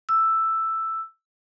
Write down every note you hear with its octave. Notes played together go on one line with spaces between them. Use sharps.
E6